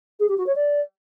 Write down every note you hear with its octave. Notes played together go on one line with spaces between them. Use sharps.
G#4
G4
F#4
C#5
D5